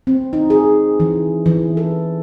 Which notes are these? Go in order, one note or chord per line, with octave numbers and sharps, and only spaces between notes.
C4
D#4
G#4
E3
E3
A4